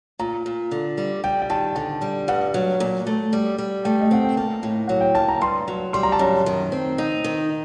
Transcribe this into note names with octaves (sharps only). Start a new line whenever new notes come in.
A#2 A#5
A#2
D3
G3
G3 G5
G5
D#3 A5
D3 A5
G3
G2 F#5
F#3
A#2
A3
G3
G3
A3 G5
D#5
C4 F#5
G5
A#3 A5
A2
F#3 F#5
G5
A#3 A5
A#5
G2 C6
F#3
G3 C6
A#5
A5
F#2 A#5
D#3
C4
D#4 D#5
D#3